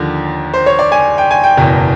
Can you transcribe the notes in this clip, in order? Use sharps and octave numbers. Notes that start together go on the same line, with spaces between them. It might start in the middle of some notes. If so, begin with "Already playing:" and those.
Already playing: D#2 D3 F3
C5
C#5
D5
G#5
G5
G#5
G5
F#1 E2 B2